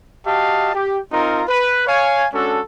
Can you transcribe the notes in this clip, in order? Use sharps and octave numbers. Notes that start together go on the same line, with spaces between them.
F#4 G4 D#5 F5 A5
G4
C4 D#4 F4 A#4 A#5 C6
B4
C#5 F5 G#5
G#3 C#4 D4 F#4 A4